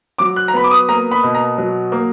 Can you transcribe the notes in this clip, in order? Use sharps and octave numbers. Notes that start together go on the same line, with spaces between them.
F#3 D6
F#6
A#5
B3 B5
D6
D#6
A#3 A#5
B5
B2
A#5
F#3
A#3